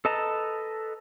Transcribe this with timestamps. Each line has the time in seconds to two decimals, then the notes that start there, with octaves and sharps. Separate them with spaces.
0.05 A4 B4 D#5 A5 A#5